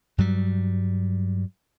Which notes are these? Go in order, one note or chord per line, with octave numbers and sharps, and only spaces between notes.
G2 F#3 G3